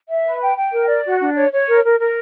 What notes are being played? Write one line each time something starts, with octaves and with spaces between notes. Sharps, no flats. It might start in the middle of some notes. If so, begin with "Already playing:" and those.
E5
B4
G5
G5
A#4
D5
F#4
D4
C#5
C#5
A#4
A#4
A#4